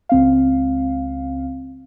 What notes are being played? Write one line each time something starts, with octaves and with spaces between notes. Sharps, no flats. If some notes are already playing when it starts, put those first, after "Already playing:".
C#2 C4 F5